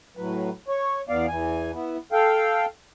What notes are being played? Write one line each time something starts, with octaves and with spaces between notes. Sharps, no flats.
A2 F#3 B4
C#5
E2 B3 D5 F5
E2 E3 G#5
B3 E4
A4 F5 G5